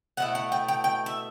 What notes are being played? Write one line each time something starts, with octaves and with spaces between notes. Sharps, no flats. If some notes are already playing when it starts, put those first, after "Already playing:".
B2 A3 E4 F#5
F#5
G5
G5
G5
E5